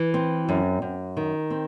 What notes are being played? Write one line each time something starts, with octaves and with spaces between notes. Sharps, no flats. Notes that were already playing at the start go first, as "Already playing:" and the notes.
Already playing: E3
C4
F#2
F#2
D#3
C4